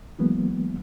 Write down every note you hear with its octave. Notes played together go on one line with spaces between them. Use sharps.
E3 F#3 G#3 A#3 B3